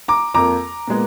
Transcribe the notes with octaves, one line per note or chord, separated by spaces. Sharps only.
A#5 D6
F2 F3 A#3 A#5 D6
A#2 G#3 B3